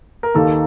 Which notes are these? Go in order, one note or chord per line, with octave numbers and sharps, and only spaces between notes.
A#4
D#2 D#3 A#3 A4